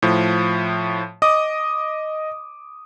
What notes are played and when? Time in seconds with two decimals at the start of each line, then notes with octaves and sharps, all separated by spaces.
0.02 A2 F3
1.22 D#5 D6 D#6